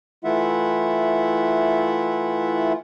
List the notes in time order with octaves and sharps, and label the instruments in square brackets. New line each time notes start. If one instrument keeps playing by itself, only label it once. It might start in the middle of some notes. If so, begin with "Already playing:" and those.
[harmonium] E3 A3 E4 F4 E5 F#5